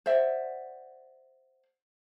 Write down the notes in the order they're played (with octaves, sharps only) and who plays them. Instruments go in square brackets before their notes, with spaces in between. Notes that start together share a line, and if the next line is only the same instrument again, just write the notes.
[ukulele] C5 D5 E5 F#5